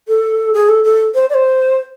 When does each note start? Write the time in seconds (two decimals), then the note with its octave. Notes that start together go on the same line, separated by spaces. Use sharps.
0.08 A4
0.54 G#4
0.69 A4
0.84 A4
1.14 C5
1.30 D5
1.34 C5